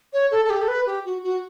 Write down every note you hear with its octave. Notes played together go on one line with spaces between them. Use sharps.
C#5
A4
A4
G4
A4
B4
G4
F#4
F#4